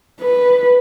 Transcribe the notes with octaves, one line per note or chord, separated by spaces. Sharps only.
B4